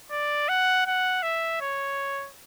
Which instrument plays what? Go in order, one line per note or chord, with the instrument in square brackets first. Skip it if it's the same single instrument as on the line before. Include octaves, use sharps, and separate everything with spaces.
[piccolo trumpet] D5
F#5
F#5
E5
C#5